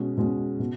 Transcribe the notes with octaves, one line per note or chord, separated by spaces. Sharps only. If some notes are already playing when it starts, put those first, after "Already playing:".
Already playing: B2 G#3 C#4
B2 G#3 C#4
B2